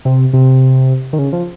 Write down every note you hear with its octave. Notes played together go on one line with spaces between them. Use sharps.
C3
C3
D#3
C#3
F3